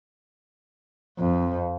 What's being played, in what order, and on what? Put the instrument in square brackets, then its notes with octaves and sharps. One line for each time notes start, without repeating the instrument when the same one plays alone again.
[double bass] F2